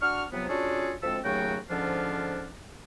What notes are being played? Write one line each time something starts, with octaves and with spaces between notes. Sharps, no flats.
D4 F#4 C#6 F6
C3 F3 F#3 B3
C#4 D4 F4 F#4 G#4 A4
D2 F3 G#3 C4 A4 E6
D#2 C#3 F#3 A3 F#4 G5
G#2 D3 F3 C#4 D4 F4